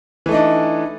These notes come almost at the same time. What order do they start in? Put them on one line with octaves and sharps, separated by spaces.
E3 A3 D#4 D4